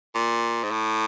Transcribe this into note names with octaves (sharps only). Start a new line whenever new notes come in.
A#2
G#2
A2